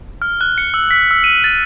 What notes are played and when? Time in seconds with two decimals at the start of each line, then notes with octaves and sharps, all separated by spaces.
0.22 F6
0.41 F#6
0.58 C#7
0.74 E6
0.91 B6
1.11 E6
1.24 D#7
1.44 A6